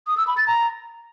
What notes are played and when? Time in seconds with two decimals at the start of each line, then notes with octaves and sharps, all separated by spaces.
0.07 D#6
0.17 E6
0.27 B5
0.37 A6
0.47 A#5